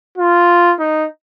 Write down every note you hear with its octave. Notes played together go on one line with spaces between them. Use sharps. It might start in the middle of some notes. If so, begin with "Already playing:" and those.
F4
D#4